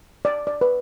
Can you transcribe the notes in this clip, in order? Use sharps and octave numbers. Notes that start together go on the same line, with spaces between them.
D5
D5
B4